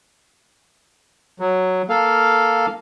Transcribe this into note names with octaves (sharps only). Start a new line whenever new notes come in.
F#3
A#3 A4 F5